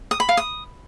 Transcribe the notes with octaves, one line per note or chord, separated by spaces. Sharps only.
D#6
B5
F5
D#6